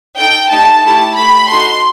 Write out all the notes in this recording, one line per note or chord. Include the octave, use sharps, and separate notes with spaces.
D#4 A4 G5
A3 D#4 G4 A5
A3 E4 G4 A5
A3 E4 G4 B5
D#4 F#4 A4 C6